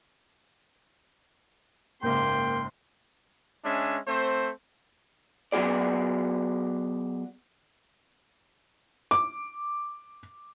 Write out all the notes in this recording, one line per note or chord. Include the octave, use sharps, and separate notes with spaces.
F#1 G#2 A#3 G5 C6
G#3 C#4 D4 E5
A3 C4 C5
F#3 B3 F#4 G#4 D5
D6